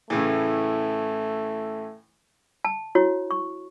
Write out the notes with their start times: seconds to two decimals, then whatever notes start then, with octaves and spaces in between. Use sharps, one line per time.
0.10 A2 C#3 E3 A3
2.65 A5
2.95 E4 F#4 C#5
3.31 C#6